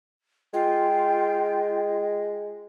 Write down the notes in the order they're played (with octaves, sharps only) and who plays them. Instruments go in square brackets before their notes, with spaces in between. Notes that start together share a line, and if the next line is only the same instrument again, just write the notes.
[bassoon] G#3 [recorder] F4 [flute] G5